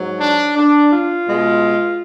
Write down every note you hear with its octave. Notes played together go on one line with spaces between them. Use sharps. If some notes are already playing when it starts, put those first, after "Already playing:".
Already playing: G#2 F#3
D4
D4
F4
B2 G#3